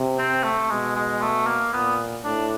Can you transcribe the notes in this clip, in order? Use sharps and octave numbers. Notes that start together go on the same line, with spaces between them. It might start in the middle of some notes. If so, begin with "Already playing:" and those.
Already playing: C3
C4
A3
B2 G#3
G#3
A3
A#3
A#2 B3
A2 D4